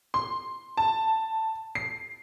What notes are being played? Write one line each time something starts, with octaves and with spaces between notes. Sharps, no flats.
C6
A5
C7